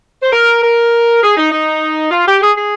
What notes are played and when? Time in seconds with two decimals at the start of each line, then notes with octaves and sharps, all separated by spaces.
0.21 C5
0.32 A#4
0.62 A#4
1.22 G#4
1.37 D#4
1.52 D#4
2.11 F4
2.27 G4
2.42 G#4
2.56 G#4